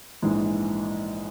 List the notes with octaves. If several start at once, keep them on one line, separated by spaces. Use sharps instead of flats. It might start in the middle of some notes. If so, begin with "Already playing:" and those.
A#1 G#2 E3 G#3